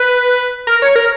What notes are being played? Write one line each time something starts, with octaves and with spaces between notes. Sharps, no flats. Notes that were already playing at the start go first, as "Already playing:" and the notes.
Already playing: B4
A#4
C#5
A#4